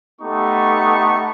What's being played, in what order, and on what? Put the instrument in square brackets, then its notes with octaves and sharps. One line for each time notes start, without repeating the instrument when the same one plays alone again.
[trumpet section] A3 B3 D#4 G4 A4 C#6